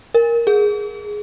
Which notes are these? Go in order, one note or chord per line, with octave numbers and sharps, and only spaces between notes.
A#4
G#4